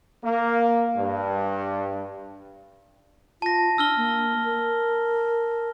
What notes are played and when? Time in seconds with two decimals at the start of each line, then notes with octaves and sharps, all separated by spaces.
0.23 A#3
0.97 G2
3.42 F4 A5 A#6
3.78 D4 E6 F6 G7
3.97 A#3
4.44 A#4